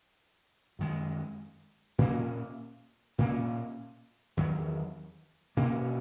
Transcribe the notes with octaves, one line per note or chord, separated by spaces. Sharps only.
F#2 D#3 G#3
A#2 A#3 C#4
A#2 A#3 C#4
E2 D#3 F#3
B2 A#3 C#4